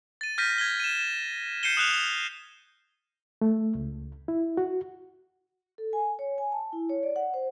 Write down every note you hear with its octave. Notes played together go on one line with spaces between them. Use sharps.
A6 D#7
F6 G6 A#6 B6 D#7
G#6 G7
D#7 E7
G6 C7 C#7 D#7 E7 G7
D#6 F6 F#6 F7
A3
C#2
E4
F#4
A4
G#5
C#5
G#5
A5
E4
C#5
D5
F#5
C5